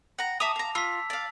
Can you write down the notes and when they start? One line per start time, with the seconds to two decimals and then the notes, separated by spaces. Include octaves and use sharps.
0.19 F#5 A#5
0.40 E5 A5 A#5 D6 D#6 F7
0.56 F5 A#5
0.75 F4 E6 B6
1.10 D5 F5